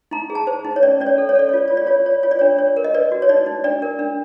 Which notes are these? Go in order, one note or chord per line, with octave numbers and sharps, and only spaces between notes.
D#4 A#5
G#4
A5
C5
D#4
C#5
C#4 D5
C#4 D5
C#5
A4
C#5
A4 D5
C#5
F4 D5
F4 C#5
D5
F4 C#5
C#5
F4 C#5
D5
D4 C#5
C#5
A#4
D#5
B4 D5
F#4
C#5
D#4 D5
D#4
D4 D5
A#4
D4